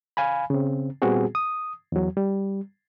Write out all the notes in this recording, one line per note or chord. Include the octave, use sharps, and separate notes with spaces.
F5 G#5 B5
C#3 C4
A#2 G3 B3 C4 F#4 G#4
D#6
E2 F#3
G3